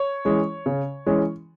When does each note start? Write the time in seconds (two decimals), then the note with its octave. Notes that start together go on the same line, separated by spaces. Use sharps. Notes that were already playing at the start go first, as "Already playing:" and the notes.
Already playing: C#5
0.25 E3 G#3 C#4
0.66 C#3
1.06 E3 G#3 C#4